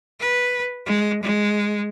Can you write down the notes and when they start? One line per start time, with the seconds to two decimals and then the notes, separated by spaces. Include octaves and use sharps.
0.20 B4
0.86 G#3
1.23 G#3